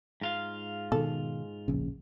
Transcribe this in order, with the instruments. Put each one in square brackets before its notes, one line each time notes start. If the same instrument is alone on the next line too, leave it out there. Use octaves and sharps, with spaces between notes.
[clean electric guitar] G#2 F4 F5
[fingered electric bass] B2 D#3 [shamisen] A4
[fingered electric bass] D1 A#1 C#3